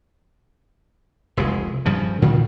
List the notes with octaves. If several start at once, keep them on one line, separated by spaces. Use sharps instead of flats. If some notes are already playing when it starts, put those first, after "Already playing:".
F1 C2 C#3 G#3
G2 C#3 F3
G2 A#2 D3 D#3